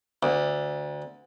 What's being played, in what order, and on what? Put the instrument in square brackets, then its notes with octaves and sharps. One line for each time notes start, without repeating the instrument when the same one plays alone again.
[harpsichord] D2